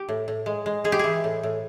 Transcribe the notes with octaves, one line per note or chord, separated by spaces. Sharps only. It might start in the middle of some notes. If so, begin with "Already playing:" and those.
Already playing: G4
A2
A2
G#3
G#3
G#3 G#4
G4
E3 G#4
A2
A2